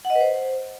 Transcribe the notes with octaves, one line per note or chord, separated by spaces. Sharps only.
F#5
D#5
B4
C5